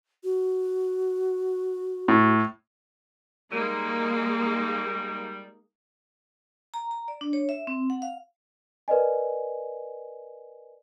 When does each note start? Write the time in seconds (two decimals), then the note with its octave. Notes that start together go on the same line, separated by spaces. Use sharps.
0.24 F#4
2.08 A2
3.52 G3 G#3 A#3 D#4
6.74 A#5
6.91 A#5
7.08 D5
7.21 D4
7.33 C#5
7.49 E5
7.67 C4
7.90 F#5
8.02 F5
8.88 A#4 B4 D5 D#5 G#5